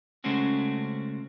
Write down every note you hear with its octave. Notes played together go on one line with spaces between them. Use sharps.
C#3 G#3 A3 C4 C#4 F#4